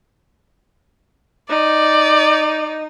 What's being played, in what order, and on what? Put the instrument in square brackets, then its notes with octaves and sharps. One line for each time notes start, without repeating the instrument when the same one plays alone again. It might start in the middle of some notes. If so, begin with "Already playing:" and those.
[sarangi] D#4 [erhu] D5